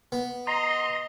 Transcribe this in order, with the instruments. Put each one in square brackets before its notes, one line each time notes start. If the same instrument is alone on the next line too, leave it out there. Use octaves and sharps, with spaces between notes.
[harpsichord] B3
[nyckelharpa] D#5 [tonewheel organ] A#5 C6